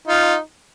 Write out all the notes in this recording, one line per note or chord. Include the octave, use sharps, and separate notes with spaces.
D#4 F4